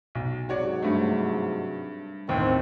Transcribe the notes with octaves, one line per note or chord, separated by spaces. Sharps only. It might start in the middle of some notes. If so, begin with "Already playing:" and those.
B1
G#2 C3 F#3 F#4 C#5 D5
G2 A3
A1 D#2 D#3 C4